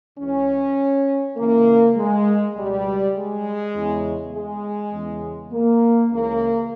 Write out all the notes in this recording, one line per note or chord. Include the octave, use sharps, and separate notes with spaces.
C#2 C#3 E3 C#4
C#2 C#3 E3 A#3
G#3
C#2 B2 G3
G#3
E2 C#3 E3
G#3
E2 C#3 E3
A#3
C#2 C#3 E3 A#3